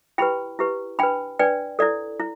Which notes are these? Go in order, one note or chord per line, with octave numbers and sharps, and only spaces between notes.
E4 G4 B4 G5 B5
E4 G4 B4
D4 B4 G5 B5
D4 B4 D5 G5
E4 A4 D5
E4